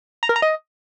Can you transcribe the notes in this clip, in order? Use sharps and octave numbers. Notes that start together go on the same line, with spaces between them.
A#5
A#4
A#5
D#5